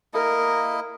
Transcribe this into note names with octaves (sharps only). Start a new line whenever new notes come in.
A#3 E4 A#4 D#5